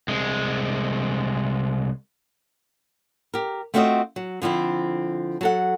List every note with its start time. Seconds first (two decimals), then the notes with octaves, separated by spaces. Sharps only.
0.08 C2 G#3
3.34 G4 A#4
3.74 A3 C4 F4 F#4 D5 D#5
4.16 F#3
4.42 D3 F3 C4 E4
5.41 F#3 A4 F#5